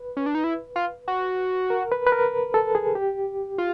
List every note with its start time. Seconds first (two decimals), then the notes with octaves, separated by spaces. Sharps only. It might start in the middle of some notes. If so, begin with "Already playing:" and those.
Already playing: B4
0.17 C#4
0.26 D4
0.35 D#4
0.44 E4
0.76 F4
1.08 F#4
1.70 A#4
1.92 B4
2.07 B4
2.12 A#4
2.54 A4
2.75 G#4
2.95 G4
3.58 F4